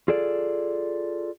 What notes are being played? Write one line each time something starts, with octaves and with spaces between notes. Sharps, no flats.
F4 G#4 A4 D5